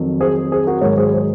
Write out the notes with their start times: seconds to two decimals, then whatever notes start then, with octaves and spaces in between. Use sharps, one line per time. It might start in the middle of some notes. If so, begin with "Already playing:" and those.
Already playing: F2 D#3 F#3
0.20 G#4 C5
0.52 G#4 C5
0.66 F#4 A#4
0.81 G#2 D#3 F#3 A#4 C#5
0.97 G#4 C5
1.13 G#4 C5